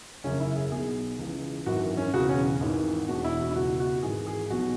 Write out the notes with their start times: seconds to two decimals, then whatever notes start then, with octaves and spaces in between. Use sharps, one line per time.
0.24 F#1 F#2 C#3 C#4
0.40 E4
0.56 G#4
0.71 B1 B2 G#4
1.19 C#2 C#3 E3
1.66 G#1 F#2 E3 F#4
1.97 C#4
2.14 E1 E2 C#3 E3 F#4
2.29 C#4
2.60 G#1 G#2 E3
3.08 E1 E2 B2 F#4
3.24 E4
3.40 F#4
3.51 E4
3.55 C#2 B2 F#4
3.80 F#4
4.03 G#1 G#2 E3 G#4
4.27 G#4
4.50 B1 B2 F#4